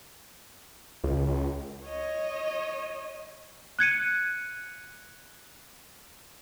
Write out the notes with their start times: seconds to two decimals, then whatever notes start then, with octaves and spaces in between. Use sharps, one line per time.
1.04 C#2
1.86 C#5 D#5
3.79 F#6 G#6 C#7 D#7